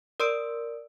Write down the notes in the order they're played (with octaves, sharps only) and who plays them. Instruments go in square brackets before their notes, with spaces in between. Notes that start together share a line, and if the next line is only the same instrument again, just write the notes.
[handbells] A#4 D5 C6 E6 D7